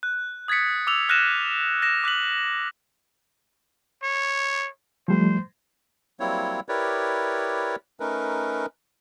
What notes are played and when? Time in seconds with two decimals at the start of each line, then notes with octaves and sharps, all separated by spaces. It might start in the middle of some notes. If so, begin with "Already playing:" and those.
0.03 F#6
0.48 D#6 G#6 A6 B6 C#7
0.87 D6 E6 F7
1.09 F6 F#6 A#6 D#7 E7
1.82 A#6 E7
2.04 D6 F#6 B6 F#7
4.03 C#5
5.08 F3 G3 A3 C5
6.20 F#3 G3 A#3 C4 E4 C#5
6.69 E4 G4 A#4 B4 C#5 D5
8.00 A3 C#4 D#4 A#4 B4